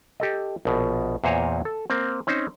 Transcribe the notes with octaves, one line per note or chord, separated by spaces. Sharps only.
G4 A4 D#5
A#1 B2
E2 A#2 C5 C#5 G#5 A#5
A4
A#3 C4
C4 C#4 D#4 C5